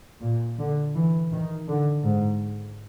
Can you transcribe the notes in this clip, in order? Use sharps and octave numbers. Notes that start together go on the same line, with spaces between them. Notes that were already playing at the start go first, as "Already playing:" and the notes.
A#2
D3
E3
D#3
D3
G#2